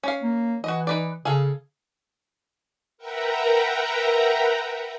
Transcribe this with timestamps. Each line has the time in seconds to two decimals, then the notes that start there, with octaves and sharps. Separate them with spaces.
0.03 C#4 F5
0.23 A#3
0.64 E3 F#4 D#5
0.87 D#4 B4 D5
1.25 C#3 G#4 A4 F5
2.98 A#4 B4 E5 F#5 G5 A#5